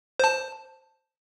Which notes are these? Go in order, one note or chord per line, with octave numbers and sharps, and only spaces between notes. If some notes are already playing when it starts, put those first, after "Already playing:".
C5 A5